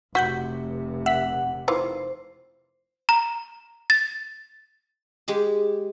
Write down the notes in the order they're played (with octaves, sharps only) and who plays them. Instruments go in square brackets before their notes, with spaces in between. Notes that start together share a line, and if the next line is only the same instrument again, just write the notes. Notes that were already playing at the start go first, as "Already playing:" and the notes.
[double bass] F1 C3 [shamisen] F#4 [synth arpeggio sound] F#5 G6 B6
[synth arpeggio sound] E5 B6 [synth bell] F#5
[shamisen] D#3 E3 F4 [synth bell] C5
[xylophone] A#5
A6
[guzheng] G#3 G4 G#4